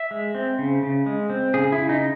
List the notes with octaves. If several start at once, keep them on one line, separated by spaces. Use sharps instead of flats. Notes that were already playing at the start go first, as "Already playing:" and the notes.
Already playing: E5
G#3
C4
C#3
C#3
G#3
C4
C#3 G#4
E4
C#3
D#4